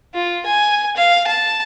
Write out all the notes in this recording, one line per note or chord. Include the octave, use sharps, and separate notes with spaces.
F4
G#5
F5
A5